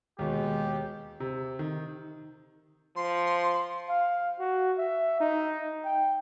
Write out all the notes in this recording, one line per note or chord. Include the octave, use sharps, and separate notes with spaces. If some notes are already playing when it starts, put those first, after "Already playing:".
D#2 B2 G#3 G4
C3
D#3
F3 C6
F5
F#4
E5
D#4
G5